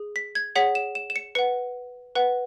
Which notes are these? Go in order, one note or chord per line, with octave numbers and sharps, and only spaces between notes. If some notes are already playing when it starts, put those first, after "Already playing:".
Already playing: G#4
B6
G#6
G#4 C#5 F#5 B6
E7
E7
E7
C#7
B4 F#5 C#7
B4 F#5